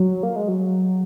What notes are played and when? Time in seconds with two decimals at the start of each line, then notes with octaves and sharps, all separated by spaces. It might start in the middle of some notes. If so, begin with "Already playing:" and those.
Already playing: F#3
0.23 A#3
0.36 G#3
0.48 F#3